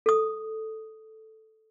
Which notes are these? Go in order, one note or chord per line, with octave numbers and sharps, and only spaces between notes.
A4 D#6